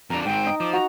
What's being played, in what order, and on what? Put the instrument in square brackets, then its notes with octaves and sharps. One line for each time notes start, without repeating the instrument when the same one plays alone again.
[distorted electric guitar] F2 D4 [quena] A#5
[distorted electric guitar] G#2 C4 [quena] G5
[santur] D#4
[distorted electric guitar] F3 [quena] D6
[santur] F#4 [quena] A#5